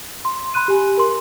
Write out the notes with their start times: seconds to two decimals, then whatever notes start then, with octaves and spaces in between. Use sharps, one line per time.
0.25 C6
0.54 B5 C6 F#6 D#7
0.68 G4 G#5
0.97 A#4 C6